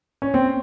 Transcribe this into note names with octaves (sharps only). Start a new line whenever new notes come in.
C#4
C4